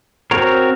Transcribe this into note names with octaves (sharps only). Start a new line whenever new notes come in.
C4 F#4 A#4 C#5